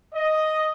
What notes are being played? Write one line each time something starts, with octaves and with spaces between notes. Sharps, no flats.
D#5